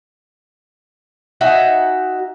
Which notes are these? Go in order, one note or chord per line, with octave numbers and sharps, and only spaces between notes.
D#4 F#4 E5 G#5